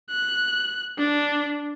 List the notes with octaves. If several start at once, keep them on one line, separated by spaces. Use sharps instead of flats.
F#6
D4